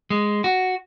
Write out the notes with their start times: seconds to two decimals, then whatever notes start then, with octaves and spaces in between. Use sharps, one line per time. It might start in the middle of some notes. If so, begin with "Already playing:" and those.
0.10 G#3
0.44 F#4